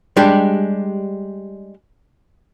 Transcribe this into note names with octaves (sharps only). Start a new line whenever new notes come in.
G3 G#3 D4 G4